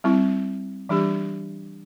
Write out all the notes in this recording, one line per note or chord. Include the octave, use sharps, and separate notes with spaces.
G3 C4 E4
E3 G3 D4 G4